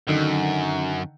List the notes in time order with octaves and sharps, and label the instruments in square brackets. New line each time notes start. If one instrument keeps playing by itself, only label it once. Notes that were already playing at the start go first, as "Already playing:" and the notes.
[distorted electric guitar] F#2 [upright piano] D3 D#3